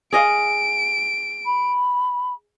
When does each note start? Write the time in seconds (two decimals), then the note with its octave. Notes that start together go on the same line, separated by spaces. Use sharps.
0.13 G#4 D#5 F5 D7
1.45 B5